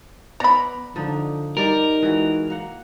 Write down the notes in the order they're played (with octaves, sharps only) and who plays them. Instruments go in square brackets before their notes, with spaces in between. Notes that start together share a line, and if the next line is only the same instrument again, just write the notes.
[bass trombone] B3 [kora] D5 F#5 [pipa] A#5 B5
[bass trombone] D3 [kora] F3 D4 D#4
[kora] G3 G4 D5 [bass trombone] D#4 [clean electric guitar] A#4
[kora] E3 G#3 F#4
A#3 F#5